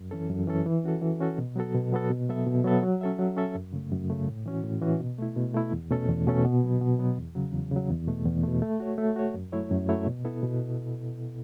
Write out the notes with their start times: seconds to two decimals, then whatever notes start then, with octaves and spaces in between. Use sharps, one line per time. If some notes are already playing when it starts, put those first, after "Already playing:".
Already playing: F#2
0.11 E3 C#4 A4
0.29 F#2
0.47 E3 C#4 A4
0.66 E3
0.84 C#4 F#4 A4
1.02 E3
1.21 C#4 F#4 A4
1.38 B2
1.56 F#3 B3 F#4 A4
1.75 B2
1.92 F#3 B3 F#4 A4
2.10 B2
2.29 F#3 B3 A4 E5
2.47 B2
2.64 F#3 B3 A4 E5
2.83 F#3
3.01 C#4 A4 E5
3.19 F#3
3.37 C#4 A4 E5
3.55 F#2
3.73 C#3 A3
3.91 F#2
4.10 C#3 A3
4.28 A2
4.46 E3 C#4 F#4
4.64 A2
4.82 E3 C#4 F#4
5.00 B2
5.18 A3 E4
5.36 B2
5.54 A3 E4
5.72 E2
5.91 B2 A3 C#4 A4
6.08 E2
6.27 B2 A3 C#4 A4
6.45 B2
6.63 F#3 B3
6.81 B2
6.99 F#3 B3
7.17 E2
7.35 C#3 F#3
7.53 E2
7.71 C#3 F#3
7.90 E2
8.07 B2 A3
8.25 E2
8.44 B2 A3
8.62 A3
8.80 F#4 C#5
8.98 A3
9.16 F#4 C#5
9.34 F#2
9.52 F#3 A3 E4 C#5
9.71 F#2
9.89 F#3 A3 E4 C#5
10.06 B2
10.25 B3 E4 A4
10.43 B2